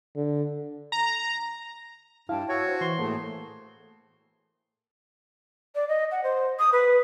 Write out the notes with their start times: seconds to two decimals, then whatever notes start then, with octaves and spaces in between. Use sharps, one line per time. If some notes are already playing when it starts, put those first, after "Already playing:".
0.16 D3
0.92 A#5
2.29 G2 E4 F5 G5 A5
2.49 F#4 C#5 E6
2.65 C5
2.81 E3 C6
2.99 A2 A3 A#3 G#4 A5
5.75 D5
5.88 D#5
6.11 F#5
6.24 C5
6.59 D#6
6.73 B4